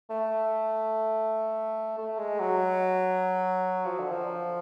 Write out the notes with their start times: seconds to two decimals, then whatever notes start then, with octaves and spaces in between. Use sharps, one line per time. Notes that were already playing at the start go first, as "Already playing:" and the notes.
0.10 A3
1.98 A3
2.19 G#3
2.40 F#3
3.85 F3
3.99 D3
4.11 F3